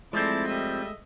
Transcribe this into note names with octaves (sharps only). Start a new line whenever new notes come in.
F3 G#3 A3 C4 E4 D5 A5
G3 D#5 E5